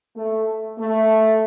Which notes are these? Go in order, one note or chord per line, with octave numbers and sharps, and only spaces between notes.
A3
A3